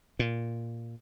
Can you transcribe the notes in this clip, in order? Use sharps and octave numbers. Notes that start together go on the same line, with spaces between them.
A#2